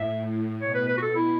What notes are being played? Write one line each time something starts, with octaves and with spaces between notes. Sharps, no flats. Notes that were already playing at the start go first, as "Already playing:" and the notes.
Already playing: A2 E5
B2 C#5
B4
B4
F#4
A4
E4